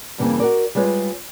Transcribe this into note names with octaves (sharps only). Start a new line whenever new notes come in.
G2 C#3 E3 A3 A#3 C4
F#4 A#4 D5
G3 G#3 F4 B4 C#5